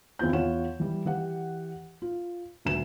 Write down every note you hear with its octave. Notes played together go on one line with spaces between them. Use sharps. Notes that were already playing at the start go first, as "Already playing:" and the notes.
E2 C4 F4 G6
E2 F4 C#5 F#5 E7
E3 G3
E3 G4 F#5
F4
D#1 D2 B4 E7